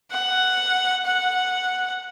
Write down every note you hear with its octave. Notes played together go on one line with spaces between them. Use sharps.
F#5
F#5